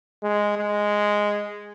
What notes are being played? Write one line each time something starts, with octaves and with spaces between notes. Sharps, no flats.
G#3
G#3